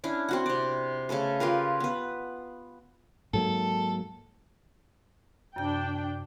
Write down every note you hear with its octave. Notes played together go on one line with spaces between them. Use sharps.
C#4 D4 E4
C4 F#4 F#5
C3 D5
C#3 A3 A4 B4
F4 G4 A#4 B4
B3 B4
G#2 F#3 A#3 A4
F#2 C3 D4 G5 G6